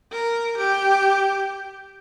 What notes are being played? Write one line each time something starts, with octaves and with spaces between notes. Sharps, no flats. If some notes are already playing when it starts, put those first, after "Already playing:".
A#4
G4